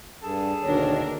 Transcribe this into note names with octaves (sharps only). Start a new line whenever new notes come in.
G2 G#4 A4 A5
D2 B2 D#3 A#3 D4 A#4 C#5